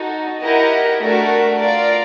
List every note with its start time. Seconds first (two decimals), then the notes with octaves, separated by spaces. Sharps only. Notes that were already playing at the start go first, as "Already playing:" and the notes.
Already playing: D#4 F#4 A4
0.42 E4 G4 A#4 D#5 F#5
1.01 A3 D4 F#4 A#4
1.61 F4 A#4 D5